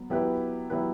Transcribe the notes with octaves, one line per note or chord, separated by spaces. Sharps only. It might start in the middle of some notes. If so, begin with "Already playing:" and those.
Already playing: F#3 B3
F#3 B3 E4 G4 B4
F#3 B3 E4 G4 B4